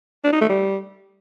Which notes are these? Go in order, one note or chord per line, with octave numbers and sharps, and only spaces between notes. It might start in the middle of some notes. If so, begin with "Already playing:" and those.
D4
D#4
A3
G3